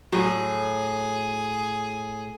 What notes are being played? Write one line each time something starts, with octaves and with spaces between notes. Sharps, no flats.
A2 F#3 G#4